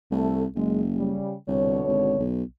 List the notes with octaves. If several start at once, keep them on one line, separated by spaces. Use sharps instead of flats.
C2 A3 A4
F#1 G#3
C#3 G3
C2 B2 D3 C#5
G#1
B1